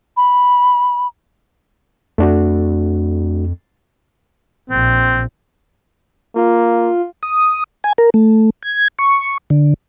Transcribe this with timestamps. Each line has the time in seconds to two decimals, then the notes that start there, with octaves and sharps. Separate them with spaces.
0.17 B5
2.18 F2 A3 D4 F#4
4.70 A#1 C4
6.35 A#3 F4
7.23 D#6
7.84 G#5
7.98 A#4
8.14 A3
8.62 G#6
8.99 C#6
9.50 D3